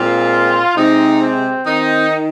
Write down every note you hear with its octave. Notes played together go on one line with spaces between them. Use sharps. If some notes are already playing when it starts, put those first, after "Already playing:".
Already playing: A#2 G#3 C4 F4
C3 G#3 C4 D#4
C4
D#3 C4 D#4